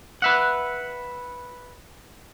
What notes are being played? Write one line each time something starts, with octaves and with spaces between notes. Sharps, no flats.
B4 E5 F#5